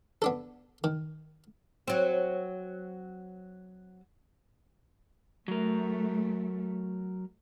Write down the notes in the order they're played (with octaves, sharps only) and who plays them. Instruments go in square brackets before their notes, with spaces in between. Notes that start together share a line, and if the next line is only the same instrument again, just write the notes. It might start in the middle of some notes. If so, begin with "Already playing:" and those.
[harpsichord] B3 D4 A4
D#3
[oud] F#3 C4
[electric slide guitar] F#3 A#4 [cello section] A3